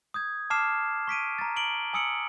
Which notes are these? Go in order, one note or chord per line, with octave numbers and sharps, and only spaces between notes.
D#6 G6 G#6
A5 D6 F6 C7 E7
C#6 B6 D7 D#7
A#5 A6
D7 F#7 G7
G#5 D#6 E6 C#7 D7 F#7